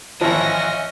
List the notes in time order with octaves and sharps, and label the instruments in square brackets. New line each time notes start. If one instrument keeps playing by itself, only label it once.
[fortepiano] G#1 E3 F3 [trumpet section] C#4 [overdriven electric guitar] D#5 E5 [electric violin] F#5 A#6